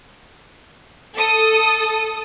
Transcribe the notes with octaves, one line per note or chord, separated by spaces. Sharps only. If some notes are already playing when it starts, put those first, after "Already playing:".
A4 D#6